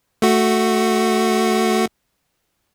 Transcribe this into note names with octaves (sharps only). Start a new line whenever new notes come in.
A3 F#4